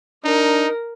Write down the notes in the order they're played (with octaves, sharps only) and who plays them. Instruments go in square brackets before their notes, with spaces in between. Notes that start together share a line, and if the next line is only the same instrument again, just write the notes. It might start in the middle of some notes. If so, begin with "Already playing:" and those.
[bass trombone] D4 [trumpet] D#4 [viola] A#4